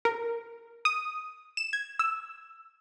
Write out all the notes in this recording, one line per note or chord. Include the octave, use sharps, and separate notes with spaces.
A#4
D#6
E7
G#6
E6